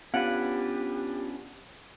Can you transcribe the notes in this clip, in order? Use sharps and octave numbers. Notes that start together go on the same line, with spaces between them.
B3 C#4 D4 F4 G4 B4 F#5 D7